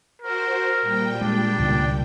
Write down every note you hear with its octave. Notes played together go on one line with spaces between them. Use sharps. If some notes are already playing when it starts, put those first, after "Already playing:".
F#4 A#4 C5
A#2 G3 G5
G#3 D4
C#2 B2 D#3